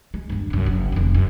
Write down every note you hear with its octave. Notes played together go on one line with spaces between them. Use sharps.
G#3
G1 D#2
C2 F#2
F#1 F#3
F1 D#2
F#2